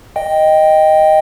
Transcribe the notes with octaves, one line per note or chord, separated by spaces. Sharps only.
D#5 G5